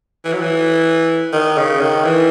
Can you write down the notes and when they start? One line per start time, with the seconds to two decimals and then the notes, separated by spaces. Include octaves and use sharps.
0.25 E3
0.33 F#3
0.41 E3
1.33 D#3
1.58 C#3
1.81 D#3
2.05 E3